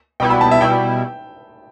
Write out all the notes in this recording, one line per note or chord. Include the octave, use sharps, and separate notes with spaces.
B2 G3 B3 E4 G5
B5
A5
E5
B2 G3 E4 G5